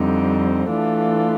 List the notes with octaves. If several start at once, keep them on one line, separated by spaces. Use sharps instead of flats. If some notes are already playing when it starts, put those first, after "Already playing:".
Already playing: F2 D3 G3 C4 D#4
E3 A3 D4 F4 A4